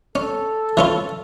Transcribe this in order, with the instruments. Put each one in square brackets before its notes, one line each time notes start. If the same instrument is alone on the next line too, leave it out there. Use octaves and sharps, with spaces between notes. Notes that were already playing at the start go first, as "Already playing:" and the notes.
[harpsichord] C#4 [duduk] A4
[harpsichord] E3 C#4 F4